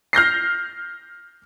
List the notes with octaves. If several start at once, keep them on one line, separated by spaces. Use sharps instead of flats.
F6 G6 A#6 C7